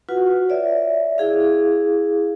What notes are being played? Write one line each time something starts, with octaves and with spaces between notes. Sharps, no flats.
F4 F#4 B4 F#5
C#5 D5 E5
E4 G#4 F5